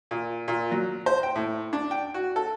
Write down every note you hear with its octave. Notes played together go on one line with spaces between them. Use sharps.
A#2
A#2
F#3
C5
G5
A2
D4
G5
F#4
A4